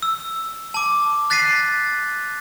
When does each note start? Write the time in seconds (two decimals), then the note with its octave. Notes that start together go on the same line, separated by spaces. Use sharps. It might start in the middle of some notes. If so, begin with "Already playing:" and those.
0.02 E6
0.74 A5 D6
1.30 F#6 A6 B6 C7 D#7